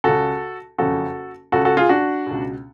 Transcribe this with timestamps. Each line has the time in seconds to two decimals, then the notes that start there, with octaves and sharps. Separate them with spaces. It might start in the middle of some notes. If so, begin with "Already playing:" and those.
0.04 C#2 C#3 F#4 A4
0.78 F#1 F2 C#3 F#4 A4
1.52 C#2 C#3 F#4 A4
1.65 F#4 A4
1.77 F4 G#4
1.89 D4 F#4
2.27 C#2 B2